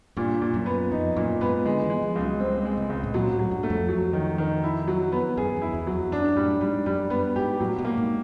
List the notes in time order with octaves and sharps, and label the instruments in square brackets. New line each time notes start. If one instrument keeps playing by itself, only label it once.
[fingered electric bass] G2 [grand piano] A#2
[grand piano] A#2
[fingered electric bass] F#2
[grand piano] B3
[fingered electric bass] F2 [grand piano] D#4
[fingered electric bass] F#2 [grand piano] A#2
[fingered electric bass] G#2 [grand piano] B3
[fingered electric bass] D3 [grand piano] G#3
[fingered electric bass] E3
[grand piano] G#3
[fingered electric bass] F3
[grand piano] C#2
[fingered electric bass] F#3
[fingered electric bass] G3 [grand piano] C4
[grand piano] G#3
[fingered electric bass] C#3
[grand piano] C#2
[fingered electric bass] A2
[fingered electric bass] A#2 [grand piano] F#3
[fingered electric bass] A2
[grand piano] F#3
[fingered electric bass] G2
[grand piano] A3
[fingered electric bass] F2
[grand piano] F#3
D#3
D#3
E4
F#3
B3
[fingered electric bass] F#2 [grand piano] G#4
[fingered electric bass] E2
[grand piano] E4
[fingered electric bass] E2
[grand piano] F#3
[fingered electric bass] F2
[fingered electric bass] F#2 [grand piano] D4
[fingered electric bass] A2 [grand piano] G3
[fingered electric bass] G#2 [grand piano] G3
[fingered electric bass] F#2 [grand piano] G3
[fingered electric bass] G2 [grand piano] B3
[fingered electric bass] G#2 [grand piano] G4
[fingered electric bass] A2 [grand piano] F#3
[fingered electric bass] B2
[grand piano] A#3
[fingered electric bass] G#2